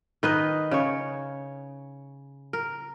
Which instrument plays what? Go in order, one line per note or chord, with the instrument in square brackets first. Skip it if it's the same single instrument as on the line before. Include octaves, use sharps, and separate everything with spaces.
[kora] D#3 B4 D#5
C#3 C#5
A#4